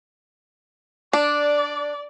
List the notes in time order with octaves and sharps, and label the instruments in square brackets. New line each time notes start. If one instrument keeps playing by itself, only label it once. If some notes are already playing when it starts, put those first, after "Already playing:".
[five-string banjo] D4 [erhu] D5